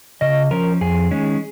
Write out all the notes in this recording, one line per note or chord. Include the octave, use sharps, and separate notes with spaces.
C#3 D#5
F3 C#4 A#4
F2 G#4
D#3 G#3 C#4